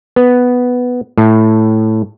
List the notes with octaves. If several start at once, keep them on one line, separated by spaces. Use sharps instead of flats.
B3
A2